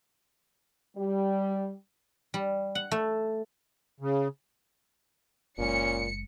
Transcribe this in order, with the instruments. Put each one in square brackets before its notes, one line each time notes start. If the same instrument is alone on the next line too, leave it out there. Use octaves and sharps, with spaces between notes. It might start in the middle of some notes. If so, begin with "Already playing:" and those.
[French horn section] G3
[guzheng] G3
F#5
A3
[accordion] C#3
[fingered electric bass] F#1 G#3 [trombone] A#2 [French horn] C#4 [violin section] C#7